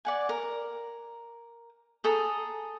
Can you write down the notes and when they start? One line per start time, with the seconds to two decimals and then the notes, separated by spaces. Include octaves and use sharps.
0.05 D5 F#5 G#5
0.29 A#4
2.04 G#4 A4 A#5 D#6